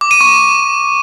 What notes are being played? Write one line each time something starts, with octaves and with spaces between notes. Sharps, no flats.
D6
D#7
C#6